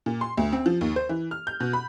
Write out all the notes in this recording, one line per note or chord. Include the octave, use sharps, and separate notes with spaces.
A#2
C6
D2
C4
F3
D#2
C5
E3
F6
G6
B2
B5